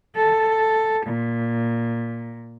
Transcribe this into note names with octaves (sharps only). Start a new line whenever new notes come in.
A4
A#2